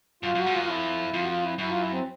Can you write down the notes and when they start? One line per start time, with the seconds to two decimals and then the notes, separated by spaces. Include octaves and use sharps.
0.23 F#2 F4
0.35 F#2 F#4
0.46 G#2
0.53 F4
0.58 F#2
0.64 F4
0.68 F2 E4
1.13 F2 F4
1.22 F#4
1.28 F4
1.43 E4
1.58 F#2 E4
1.69 F4
1.80 E4
1.92 C4